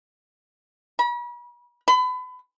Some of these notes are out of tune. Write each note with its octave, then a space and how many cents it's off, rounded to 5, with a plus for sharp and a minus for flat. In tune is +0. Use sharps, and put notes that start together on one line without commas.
B5 -40
B5 +30